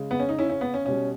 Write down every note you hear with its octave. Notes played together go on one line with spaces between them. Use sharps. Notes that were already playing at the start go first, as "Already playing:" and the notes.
Already playing: C#3 G#3
B3
C#4
D#4
C#4 E4
C#4
B3
C#4
B2 G3 C#4